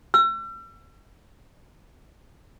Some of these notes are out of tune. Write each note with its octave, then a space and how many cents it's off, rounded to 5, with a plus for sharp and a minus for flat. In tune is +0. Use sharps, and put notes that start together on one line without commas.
E6 +40